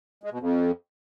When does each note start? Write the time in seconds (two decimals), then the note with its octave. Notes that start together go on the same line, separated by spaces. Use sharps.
0.24 G#3
0.31 B2
0.39 F2